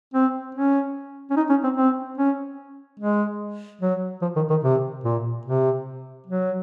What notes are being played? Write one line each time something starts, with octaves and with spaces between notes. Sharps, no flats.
C4
C#4
C#4
D#4
C#4
C4
C4
C#4
G#3
F#3
F3
D#3
D#3
C3
A#2
C3
F#3